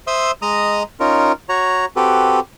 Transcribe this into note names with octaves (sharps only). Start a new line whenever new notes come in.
C5 E5 C6 D#6 E6
G#3 D#5 A#5 D#6
C#4 D#4 F4 A#4
F#4 C#5 A#5
C4 F#4 G4 A4 B4